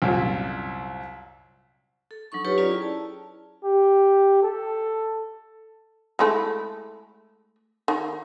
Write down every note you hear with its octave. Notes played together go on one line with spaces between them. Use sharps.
C2 F#2 A#2
A4
F#3 D4 D#4 C#6
D#4 F4 G4 A4 B4 C#5
C#4 F4 D5 A#5
E4 G#4 G5
A5
G4
A4
G#3 A3 E4
D#3